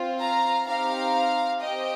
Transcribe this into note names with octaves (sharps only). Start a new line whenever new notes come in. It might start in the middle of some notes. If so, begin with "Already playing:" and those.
Already playing: C4 F4
F5 A#5
C4 D#4 G4 F5 A#5
C4 G4 D#5 G5